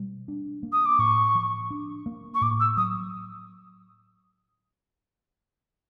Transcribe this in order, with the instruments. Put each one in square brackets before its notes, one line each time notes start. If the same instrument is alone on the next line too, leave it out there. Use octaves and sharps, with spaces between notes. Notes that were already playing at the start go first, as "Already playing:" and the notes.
Already playing: [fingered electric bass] B2 G3
D4
A#3
[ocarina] D#6
D6
[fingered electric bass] A2 [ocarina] C#6
[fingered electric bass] F3
D4
A#3
[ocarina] C#6
[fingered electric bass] A2 [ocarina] D6
[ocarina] E6
[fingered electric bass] F#3 [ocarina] D#6